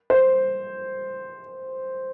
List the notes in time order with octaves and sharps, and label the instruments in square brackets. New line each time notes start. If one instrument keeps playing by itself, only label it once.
[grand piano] C5